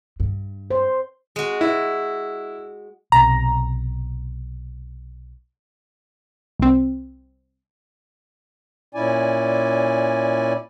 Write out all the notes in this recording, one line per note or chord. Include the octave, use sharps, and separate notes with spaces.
G2
C5
G#3 F#4
E4
B1 C3 A#5
C2 C4
A#2 C#4 E4 D5 G#5